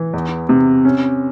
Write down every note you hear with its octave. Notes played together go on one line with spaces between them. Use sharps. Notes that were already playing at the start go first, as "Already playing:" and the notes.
Already playing: E3
E2
C3
C#4